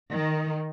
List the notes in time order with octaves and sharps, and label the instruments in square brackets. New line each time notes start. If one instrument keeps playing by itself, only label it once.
[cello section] D#3